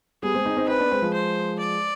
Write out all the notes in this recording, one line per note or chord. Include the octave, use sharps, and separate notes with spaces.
G3 B3 G#4
G#3 C4
C4 D#4
C4 D#4
C4 D#4 B4
B3 D4
G#3 C4
F3 G#3
C5
D5